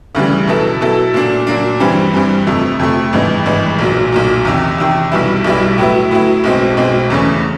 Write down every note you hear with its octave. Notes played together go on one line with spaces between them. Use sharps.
D2 C#3 E3 G3
B2 F#3 B3 E4 A4
B2 F#3 B3 E4 A4
A#2 F#3 A#3 D4
A#2 F#3 A#3 D4
G2 E3 G3 C4
G2 E3 G3 C4
F2 C3 F3 A3
F2 C3 F3 A3
G#1 G2 E3 G#3 B3
G#1 G2 E3 G#3 B3
B1 A#2 F#3
B1 A#2 F#3
E2 C3 D#3
E2 C3 D#3
B1 B2 G3 B3 E4
B1 B2 G3 B3 E4
A2 F#3 B3 E4
A2 F#3 B3 E4
B1 B2 G#3 C4
B1 B2 G#3 C4
E2 C#3 E3 A3 C#4